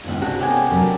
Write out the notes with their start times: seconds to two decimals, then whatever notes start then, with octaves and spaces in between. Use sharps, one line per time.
0.04 G#1 C#2 F#5 G#5
0.22 C3 D4 F#4
0.40 A3 B3 C#4 G4 G#5
0.71 C3 F#3 D4 A#4 B4 A5 A#5